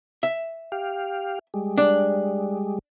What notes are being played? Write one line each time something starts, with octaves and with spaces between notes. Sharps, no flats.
E5
G4 F5
G3 G#3
D4